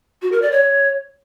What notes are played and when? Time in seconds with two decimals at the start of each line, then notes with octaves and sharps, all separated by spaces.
0.22 F#4
0.32 A#4
0.42 D5
0.52 C#5